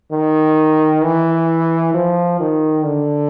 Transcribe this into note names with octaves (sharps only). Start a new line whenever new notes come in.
D#3
E3
F3
D#3
D3